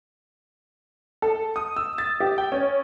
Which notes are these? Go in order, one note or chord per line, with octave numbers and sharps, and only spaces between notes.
A4
D#6
E6
A6
G4
G5
C#4